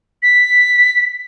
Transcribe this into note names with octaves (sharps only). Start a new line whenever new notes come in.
B6